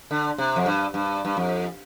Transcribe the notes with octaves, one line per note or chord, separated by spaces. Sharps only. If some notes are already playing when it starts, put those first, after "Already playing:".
D3
C3
F2
G2
G2
G2
F2